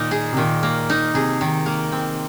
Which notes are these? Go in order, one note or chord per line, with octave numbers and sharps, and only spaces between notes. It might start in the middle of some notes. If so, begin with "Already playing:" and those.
Already playing: A#2 D#3 A#3 D#4
G#4
C3
A#2 D#3
A#3
D#4
C3 G#4
D#3
A#3
C4